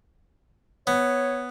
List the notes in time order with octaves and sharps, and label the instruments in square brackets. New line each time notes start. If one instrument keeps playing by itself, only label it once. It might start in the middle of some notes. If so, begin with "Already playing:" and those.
[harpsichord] B3 [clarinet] C#5